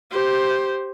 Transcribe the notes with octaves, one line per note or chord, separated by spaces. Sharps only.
G4 C5